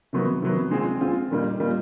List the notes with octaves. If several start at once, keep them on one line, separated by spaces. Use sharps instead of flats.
C3 D#3 F#3 B3
C3 D#3 F#3 B3
G#3 C4 F4 G#4
G#3 C4 F4 G#4
A#2 G3 A#3 D#4
A#2 G3 A#3 D#4